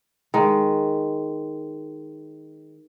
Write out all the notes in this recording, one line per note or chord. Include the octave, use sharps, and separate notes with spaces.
D#3 G#3